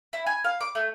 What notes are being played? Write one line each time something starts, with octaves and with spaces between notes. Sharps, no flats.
E4
G#5
F5
D6
A3